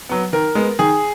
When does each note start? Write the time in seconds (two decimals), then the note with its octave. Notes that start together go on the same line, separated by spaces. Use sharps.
0.09 F#3 B3
0.33 D#3 A#4
0.55 G#3 B3
0.79 D#3 G#4